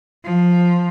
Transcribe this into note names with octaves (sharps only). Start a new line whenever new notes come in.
F3